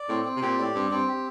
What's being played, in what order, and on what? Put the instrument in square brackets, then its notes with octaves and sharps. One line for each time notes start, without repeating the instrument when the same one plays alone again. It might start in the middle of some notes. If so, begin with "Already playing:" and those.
Already playing: [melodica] D5
[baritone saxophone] A2 [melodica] C4
[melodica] C4
[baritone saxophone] C3
[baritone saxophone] A#2 [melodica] G4
[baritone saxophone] A2 [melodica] D5
[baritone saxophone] G2 [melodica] C4
[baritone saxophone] G2 [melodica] C4
[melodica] G4